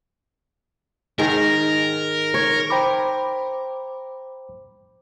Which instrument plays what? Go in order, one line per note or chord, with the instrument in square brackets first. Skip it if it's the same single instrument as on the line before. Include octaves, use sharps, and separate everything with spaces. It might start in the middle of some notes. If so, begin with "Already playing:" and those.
[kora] G#2 D#3 [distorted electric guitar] A#4
[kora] C#5
[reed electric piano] C5 G5 A#5 B5 D6